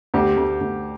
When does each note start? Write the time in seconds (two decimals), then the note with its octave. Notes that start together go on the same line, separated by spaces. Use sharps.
0.14 D2 G4
0.37 D2
0.61 D2